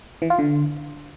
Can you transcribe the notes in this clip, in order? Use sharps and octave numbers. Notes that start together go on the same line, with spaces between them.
E3
F4
D3